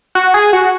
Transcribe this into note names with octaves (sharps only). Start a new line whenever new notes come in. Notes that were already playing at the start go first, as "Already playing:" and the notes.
F#4
G#4
F#4